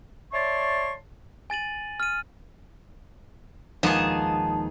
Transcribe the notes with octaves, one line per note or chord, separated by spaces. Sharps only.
C#5 D5 E5 A5 C6 C#6
G#5 A6 D#7 F#7
F6 D#7
D#2 A#2 F3 G#3 B3 D#4 G#4 A5